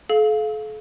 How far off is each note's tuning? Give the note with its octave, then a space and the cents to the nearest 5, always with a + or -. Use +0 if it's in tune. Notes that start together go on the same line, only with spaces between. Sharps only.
A4 -40 F5 +0